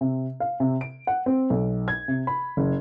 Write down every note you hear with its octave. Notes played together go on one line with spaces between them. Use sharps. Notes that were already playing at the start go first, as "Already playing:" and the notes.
C3
F5
C3
D7
F#5
C4
B1
G#6
C3
B5
F#1